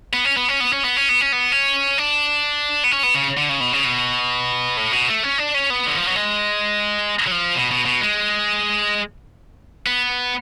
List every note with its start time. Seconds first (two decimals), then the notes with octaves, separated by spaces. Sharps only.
0.13 B3
0.25 C#4
0.37 B3
0.48 C#4
0.60 B3
0.73 C#4
0.84 B3
0.97 C#4
1.09 B3
1.21 C#4
1.32 B3
1.52 C#4
1.98 D4
2.84 B3
2.91 C#4
3.03 B3
3.15 C#3
3.37 D3
3.49 C#3
3.60 B2
3.73 C#3
3.85 B2
4.77 A2
4.92 B2
5.08 A3
5.23 C#4
5.38 D4
5.54 C#4
5.70 B3
5.86 D3
5.97 F3
6.07 F#3
6.16 G#3
7.27 F#3
7.31 F3
7.56 B2
7.71 B2
7.85 B2
8.01 G#3
9.86 B3